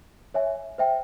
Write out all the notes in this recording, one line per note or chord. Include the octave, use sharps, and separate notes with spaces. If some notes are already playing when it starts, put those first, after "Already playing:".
C#5 E5 G#5
C5 E5 G5